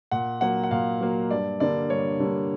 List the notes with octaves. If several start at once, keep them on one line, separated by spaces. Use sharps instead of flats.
A#2 F#5
F#3 A#3 F#5
F#5
A#2 F5
F#3 A#3
G2 D5
D3 G3 A#3 D5
G2 C#5
D3 G3 A#3